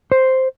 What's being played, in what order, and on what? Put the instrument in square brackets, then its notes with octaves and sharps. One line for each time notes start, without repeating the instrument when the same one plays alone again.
[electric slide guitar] C5